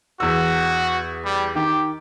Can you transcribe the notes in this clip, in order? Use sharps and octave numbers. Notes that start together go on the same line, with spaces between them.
E2 F#4 E6
G3
D#3 G4